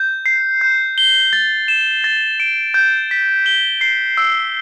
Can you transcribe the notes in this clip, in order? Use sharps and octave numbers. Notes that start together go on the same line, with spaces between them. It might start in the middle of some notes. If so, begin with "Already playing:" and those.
Already playing: G6
C7
G6
G7
A6
E7
A6
D7
G6
B6
G7
C7
E6